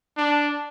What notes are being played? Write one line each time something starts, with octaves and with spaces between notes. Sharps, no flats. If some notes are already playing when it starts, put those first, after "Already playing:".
D4